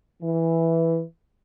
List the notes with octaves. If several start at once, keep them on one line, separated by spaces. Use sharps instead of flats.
E3